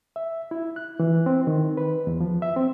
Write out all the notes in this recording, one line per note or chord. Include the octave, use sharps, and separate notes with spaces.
E5
E4
F#6
E3
C4
D#3
B4
E2
F3
E5
C4